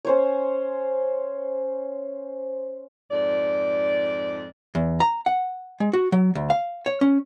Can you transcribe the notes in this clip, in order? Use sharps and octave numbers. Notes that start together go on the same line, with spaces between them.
C#4 C5 C#5
F2 G#2 D5
E2
A#5
F#5
G#3
F#4
F#3
D2
F5
C#5
C#4